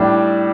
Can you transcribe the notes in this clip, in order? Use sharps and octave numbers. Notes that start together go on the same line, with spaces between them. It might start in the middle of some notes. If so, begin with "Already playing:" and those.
Already playing: A2 G3 D4